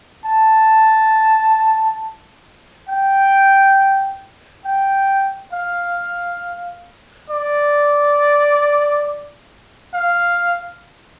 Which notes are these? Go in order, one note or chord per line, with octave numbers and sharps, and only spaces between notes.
A5
G5
G5
F5
D5
F5